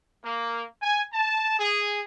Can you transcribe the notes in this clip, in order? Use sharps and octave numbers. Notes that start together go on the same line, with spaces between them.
A#3
G#5
A5
G#4